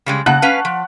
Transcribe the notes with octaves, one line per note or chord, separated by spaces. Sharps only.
C#3 G3 G#3
C#3 F#5 A5 F#6
C#4 B4 F5
F3